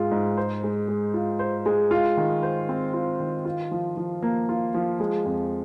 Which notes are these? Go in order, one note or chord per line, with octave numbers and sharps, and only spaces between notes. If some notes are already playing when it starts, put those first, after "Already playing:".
Already playing: G#2 G#3 F4
G#2
C5
G#3
G#3
F4
C5
G#3
F4
D#3
C5
C4
F4
D#3
F4
F3
F3
A#3
F4
F3
G#3
F2